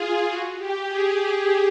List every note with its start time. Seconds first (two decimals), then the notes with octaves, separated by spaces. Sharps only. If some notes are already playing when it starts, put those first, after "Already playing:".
Already playing: F4 G#4
0.26 F#4
0.56 G4
0.86 G#4